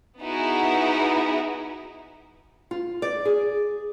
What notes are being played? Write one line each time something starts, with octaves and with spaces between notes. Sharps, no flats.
B3 D#4 E4 F#4 G#4
F4
D5
G#4